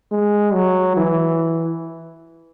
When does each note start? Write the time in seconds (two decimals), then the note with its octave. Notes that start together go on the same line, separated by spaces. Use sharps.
0.12 G#3
0.54 F#3
0.97 E3